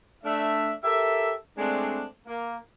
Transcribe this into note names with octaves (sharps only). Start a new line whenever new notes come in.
A3 D4 E5
G4 A4 A#4 E5
G#3 A3 C4 D4
A#3